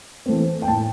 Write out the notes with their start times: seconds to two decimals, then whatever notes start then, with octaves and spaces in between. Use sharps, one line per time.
0.26 E3 A3 C4
0.62 G5
0.68 A2 A5